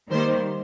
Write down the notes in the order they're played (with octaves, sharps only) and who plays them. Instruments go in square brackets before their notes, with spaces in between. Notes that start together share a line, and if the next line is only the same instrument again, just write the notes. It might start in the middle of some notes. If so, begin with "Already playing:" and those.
[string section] D#3 G3 A#3 C5